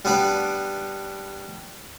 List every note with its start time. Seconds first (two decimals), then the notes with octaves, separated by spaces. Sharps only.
0.05 G3 B3 D4 D5